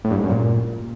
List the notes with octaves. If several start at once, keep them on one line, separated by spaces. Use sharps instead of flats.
A2
G2
G#2
F#2
A#2